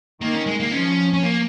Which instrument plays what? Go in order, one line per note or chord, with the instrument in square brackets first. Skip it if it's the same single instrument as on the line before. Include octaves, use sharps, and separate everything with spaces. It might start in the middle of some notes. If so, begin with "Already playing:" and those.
[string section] D#3 [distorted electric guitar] A#3
[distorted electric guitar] C#4
G#3
A#3
[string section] F3 [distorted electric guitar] C#4
[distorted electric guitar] C#4
A#3